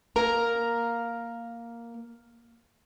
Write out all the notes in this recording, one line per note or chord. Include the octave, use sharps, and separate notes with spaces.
A#3 A#4 A#5